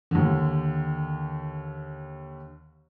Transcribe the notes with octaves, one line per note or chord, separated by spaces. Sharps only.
D#2 D3